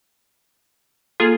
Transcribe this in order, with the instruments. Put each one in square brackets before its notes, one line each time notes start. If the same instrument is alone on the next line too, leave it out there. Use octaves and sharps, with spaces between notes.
[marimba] A#3 A4 [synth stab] F4 G#4